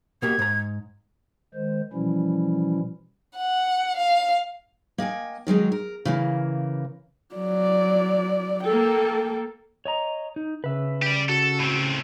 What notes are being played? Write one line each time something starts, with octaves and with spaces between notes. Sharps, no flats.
B2 A#3 G4 G#6
G#2 A#5
D#3 G#3 C5
B2 E3 F3 G3 C#4 E4
F#5
F5
A#3 D#5 G5 G#5
D#3 F#3 G#3 D#4
A#4
C#3 E3 A#3
F#3 D5
A#3 A4 G5
C#5 D#5 A#5
D#4
C#3 B4 E5
G4 D5
F#4 A4
A2 C4